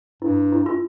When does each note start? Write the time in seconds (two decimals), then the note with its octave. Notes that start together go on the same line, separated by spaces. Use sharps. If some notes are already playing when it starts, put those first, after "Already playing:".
0.22 G2 E4
0.52 E4
0.66 F4